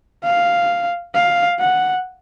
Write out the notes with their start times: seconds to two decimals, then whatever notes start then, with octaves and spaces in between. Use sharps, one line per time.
0.24 F5
1.14 F5
1.60 F#5